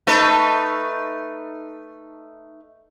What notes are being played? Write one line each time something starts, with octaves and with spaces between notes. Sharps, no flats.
A3 D#4 B4